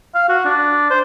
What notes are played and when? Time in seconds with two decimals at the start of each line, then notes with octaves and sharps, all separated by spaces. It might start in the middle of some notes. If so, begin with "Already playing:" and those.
0.15 F5
0.29 F#4
0.45 D4
0.90 C5